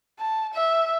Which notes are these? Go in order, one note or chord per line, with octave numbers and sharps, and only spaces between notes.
A5
E5